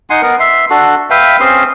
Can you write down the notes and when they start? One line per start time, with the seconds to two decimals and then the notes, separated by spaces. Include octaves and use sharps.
0.10 D#4 F#5 G#5 C6
0.22 B3 A#4
0.40 E5 C6
0.70 D4 F#4 A4
1.10 B4 E5 F5 G5
1.40 C4 C#4 G#4 C6